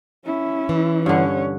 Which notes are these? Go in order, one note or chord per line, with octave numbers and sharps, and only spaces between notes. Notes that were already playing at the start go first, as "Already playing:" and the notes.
C#4 E4
E3
G2 D3 C#4 C#5